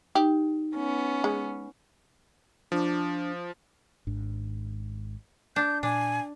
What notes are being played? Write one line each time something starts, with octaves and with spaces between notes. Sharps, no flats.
D#4 G4
B3 C#4
G#3
F3 D4
G#1 G#2 D4
D4 G6
A#2 D4 G#5